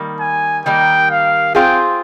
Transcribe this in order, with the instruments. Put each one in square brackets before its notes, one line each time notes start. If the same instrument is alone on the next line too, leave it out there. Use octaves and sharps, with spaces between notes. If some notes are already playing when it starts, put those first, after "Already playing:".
Already playing: [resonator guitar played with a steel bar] D#3 G3 A#3
[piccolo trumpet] G#5
[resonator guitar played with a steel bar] D#3 G3 A#3 [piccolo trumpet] G5
[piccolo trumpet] F5
[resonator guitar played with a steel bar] C4 F4 G#4 [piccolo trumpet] G5